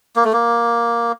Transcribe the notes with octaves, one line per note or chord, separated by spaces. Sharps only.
A#3
A3
A#3